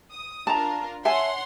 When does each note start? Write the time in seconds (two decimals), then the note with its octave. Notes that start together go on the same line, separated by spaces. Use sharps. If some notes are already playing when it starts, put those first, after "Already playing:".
0.13 D#6
0.47 D4 F4 A#4 A5 A#5
1.05 C#5 E5 F#5 G#5 A5 C6